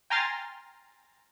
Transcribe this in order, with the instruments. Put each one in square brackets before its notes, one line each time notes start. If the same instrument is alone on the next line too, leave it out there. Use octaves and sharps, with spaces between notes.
[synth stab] G5 G#5 A#5 C6 F6 A6